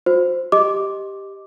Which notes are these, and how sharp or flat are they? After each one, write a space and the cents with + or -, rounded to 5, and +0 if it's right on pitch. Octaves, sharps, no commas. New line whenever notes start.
F#4 -40 C5 +0
G4 +0 D#5 +0 D6 -5